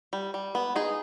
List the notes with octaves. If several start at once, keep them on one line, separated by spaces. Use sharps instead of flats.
G3
G3
B3
D#4 G#4